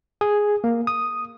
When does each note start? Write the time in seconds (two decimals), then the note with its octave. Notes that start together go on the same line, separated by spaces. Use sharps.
0.21 G#4
0.64 A#3
0.87 D#6